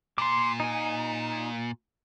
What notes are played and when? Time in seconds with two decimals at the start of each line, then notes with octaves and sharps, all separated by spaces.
0.18 A#2 C6 D6
0.60 D#4 G#5